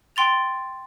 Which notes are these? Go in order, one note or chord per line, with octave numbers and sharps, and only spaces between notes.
G5 C6 A6 F7